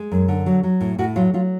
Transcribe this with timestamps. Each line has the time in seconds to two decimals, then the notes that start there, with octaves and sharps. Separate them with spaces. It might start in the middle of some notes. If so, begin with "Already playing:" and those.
Already playing: G#3
0.12 F#2
0.28 D3
0.46 F#3
0.63 F#3
0.81 A2
0.99 A2 F#4
1.16 F#3 F4
1.34 F#3 F4